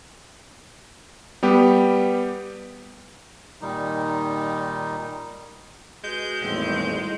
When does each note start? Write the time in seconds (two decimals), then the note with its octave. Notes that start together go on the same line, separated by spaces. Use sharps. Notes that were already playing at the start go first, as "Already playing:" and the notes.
1.43 G3 B3 G4
3.61 A#2 D#3 G3 D#4
6.04 G#3 F#4 B4 G6
6.42 G#1 E2 A2 G3 E4 C6